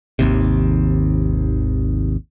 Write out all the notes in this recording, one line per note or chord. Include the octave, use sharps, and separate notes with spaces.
G#1 D#2 C3